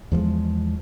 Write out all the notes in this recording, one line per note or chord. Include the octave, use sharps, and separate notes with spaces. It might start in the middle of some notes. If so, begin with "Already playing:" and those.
E2 F3 G3 G#3